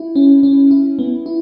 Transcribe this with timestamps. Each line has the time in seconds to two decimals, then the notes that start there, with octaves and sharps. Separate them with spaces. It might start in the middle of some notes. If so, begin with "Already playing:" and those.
Already playing: E4
0.16 C#4
0.43 C#4
0.71 E4
0.99 B3
1.26 E4